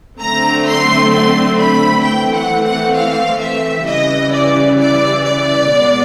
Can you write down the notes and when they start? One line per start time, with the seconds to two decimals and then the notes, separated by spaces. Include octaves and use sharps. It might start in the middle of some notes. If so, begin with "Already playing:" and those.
0.20 D3 F#3 A3 C4 A#5
0.66 C6
1.11 C6
1.58 B5
2.03 E3 A3 C4 G5
2.34 F#5
2.65 F#5
2.94 F5
3.41 E5
3.86 C#3 E3 G3 D#5
4.32 D5
4.78 D5
5.24 D5
5.69 B2 G#3 B3